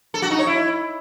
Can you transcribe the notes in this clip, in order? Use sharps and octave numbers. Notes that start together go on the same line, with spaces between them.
A4
F#4
D#4
C#5
E4